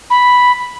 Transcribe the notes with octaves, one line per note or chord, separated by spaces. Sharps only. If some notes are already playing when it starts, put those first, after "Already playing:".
B5